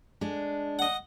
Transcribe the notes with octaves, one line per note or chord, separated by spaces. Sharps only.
G#3 D4
D#5 F#5